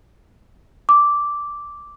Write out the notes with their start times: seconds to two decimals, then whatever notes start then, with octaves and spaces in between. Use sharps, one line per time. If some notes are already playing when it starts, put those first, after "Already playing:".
0.89 D6